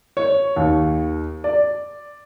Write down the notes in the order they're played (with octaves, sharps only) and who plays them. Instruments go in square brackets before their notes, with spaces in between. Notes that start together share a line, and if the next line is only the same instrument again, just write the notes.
[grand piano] C#5
D#2
D5